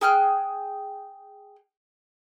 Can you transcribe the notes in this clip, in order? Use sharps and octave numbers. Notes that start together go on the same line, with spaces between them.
G#4 G5 F6 F#6